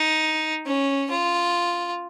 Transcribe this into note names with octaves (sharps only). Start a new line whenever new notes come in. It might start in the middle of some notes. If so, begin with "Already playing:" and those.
Already playing: D#4
C#4
F4